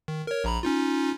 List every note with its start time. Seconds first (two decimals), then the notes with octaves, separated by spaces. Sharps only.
0.08 D#3
0.27 A#4 C#5
0.44 A#1 A#5 B5
0.63 C#4 D#4 F4